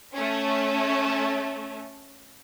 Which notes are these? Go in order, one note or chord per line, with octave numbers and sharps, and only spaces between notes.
A3 C#4